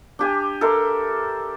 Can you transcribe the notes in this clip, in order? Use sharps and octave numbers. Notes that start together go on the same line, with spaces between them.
D4 G4 G#5
A4 A#4 E5 C6